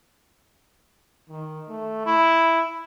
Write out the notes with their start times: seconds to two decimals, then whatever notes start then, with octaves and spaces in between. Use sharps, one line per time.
1.29 D#3
1.68 A3
2.06 E4